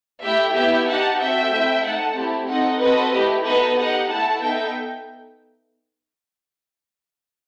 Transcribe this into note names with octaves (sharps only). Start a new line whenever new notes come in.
A3 E4 G4 E5 G5
B3 E4 G4 E5 G5
D#4 G4 F#5 A5
C4 F#4 A4 E5 G5
A3 C4 E4
A3 D#4 A4 F#5 A5
A3 C4 E4 G4
C4 D#4 A4 D#5 F#5
C4 F#4 A4 B4 D#5
A3 E4 G4
B3 D#4 F#4 A4 B4 D#5
D#4 G4 D#5 F#5
A3 E4 A4 F#5 A5
B3 D#4 A4 E5 G5